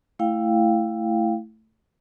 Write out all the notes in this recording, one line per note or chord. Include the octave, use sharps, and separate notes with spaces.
A3 E4 F5 G5